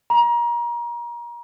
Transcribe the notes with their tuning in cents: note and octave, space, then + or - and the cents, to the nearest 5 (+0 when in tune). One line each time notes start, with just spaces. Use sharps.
A#5 +30